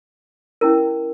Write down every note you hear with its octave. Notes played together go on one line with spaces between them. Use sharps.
C#4 E4 A#4